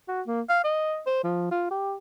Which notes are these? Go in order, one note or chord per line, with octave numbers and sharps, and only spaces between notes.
F#4
A#3
F5
D#5
C5
F3
F4
G4